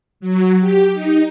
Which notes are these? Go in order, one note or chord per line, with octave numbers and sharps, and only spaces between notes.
F#3
G4
D#4